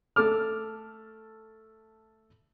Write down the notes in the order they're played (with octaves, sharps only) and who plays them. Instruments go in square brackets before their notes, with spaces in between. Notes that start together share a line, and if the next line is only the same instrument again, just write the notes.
[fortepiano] A3 A4 D6 F6